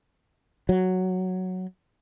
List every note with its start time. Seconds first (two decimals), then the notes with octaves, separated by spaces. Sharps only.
0.69 F#3